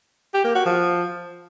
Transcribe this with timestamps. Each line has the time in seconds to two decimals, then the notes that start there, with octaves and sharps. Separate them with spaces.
0.34 G4
0.45 A#3
0.55 F#4
0.66 F3